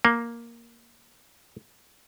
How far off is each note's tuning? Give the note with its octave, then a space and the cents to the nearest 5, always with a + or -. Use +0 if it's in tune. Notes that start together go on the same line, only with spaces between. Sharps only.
A#3 +5